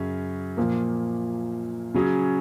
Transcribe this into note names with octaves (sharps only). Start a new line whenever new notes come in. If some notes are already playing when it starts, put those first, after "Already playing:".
Already playing: F#2 C#3 F#3 C#4 G#4
A#2 F3 A#3
C#3 F#3 C#4 G#4